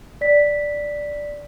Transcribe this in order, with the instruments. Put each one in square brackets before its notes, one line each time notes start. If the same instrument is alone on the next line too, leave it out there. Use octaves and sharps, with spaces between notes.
[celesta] D5 B6